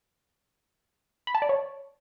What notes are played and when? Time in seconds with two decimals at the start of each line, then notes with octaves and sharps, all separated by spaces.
1.27 B5
1.35 A5
1.42 D5
1.49 C#5